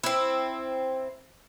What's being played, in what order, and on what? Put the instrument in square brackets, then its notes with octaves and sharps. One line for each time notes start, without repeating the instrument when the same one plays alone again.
[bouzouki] C4 E4